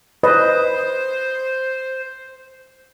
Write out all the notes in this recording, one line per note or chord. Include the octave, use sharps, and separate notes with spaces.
B4 C5 D#5